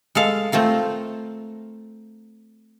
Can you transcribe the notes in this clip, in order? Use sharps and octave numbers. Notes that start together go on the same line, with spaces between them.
G#3 A4 F5
A3 C4 F4 A#4